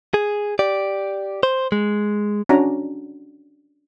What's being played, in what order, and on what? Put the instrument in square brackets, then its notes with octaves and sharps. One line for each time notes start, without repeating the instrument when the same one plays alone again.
[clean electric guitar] G#4
G4 D5
C5
G#3
[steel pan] C#4 D4 F#4 A#5